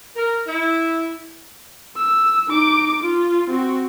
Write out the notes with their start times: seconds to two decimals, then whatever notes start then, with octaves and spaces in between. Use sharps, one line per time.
0.16 A#4
0.47 E4
1.97 E6
2.48 D#4 D6
3.03 F4
3.50 C4 F#4